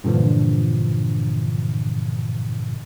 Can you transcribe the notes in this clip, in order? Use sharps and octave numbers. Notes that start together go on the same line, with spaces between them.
G2 A#2 D3 E3 F3